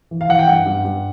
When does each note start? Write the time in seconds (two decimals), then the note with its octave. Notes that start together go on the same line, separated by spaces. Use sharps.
0.11 E3
0.21 F5
0.29 E3 F#5
0.39 G5
0.48 G2 F#5
0.66 G2
0.85 G2